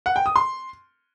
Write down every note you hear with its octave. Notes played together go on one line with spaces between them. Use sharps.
F#5
G5
D#6
C6